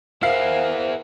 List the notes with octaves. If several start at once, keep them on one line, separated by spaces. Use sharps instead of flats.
E4 G#4 A#4 C5 F5 F#5 C7